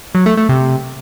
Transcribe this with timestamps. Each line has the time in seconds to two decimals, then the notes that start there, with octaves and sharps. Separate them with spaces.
0.15 F#3
0.26 A3
0.37 A3
0.49 C3